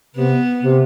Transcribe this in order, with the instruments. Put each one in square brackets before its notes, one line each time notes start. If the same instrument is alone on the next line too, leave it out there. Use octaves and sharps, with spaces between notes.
[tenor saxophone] C3 [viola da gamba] B3
[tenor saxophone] C3